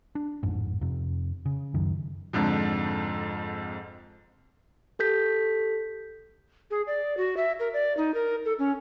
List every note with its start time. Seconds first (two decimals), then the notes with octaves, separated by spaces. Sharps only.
0.15 D4
0.43 A1 F2 G#2
0.81 F2 C3
1.46 C#3
1.74 C#2 F#2 D#3
2.33 F2 G#2 D3 F3
4.99 G4 A4 G6 B6
6.70 G#4
6.87 D5
7.17 F#4
7.37 E5
7.59 A#4
7.73 D5
7.97 D#4
8.14 A#4
8.45 A4
8.59 C#4